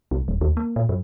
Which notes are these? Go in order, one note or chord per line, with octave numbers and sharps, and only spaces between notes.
C2
D#1
D#2
A#3
A#2
F#2